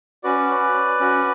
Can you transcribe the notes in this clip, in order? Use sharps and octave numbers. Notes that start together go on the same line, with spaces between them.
C#4 F#4 B4 D5
C#4 F#4